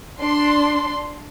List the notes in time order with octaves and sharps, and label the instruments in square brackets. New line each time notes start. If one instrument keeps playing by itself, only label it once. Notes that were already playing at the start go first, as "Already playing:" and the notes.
[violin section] D4 C6